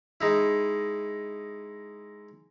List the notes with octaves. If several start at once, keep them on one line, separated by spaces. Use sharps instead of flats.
G#3 D#4 E4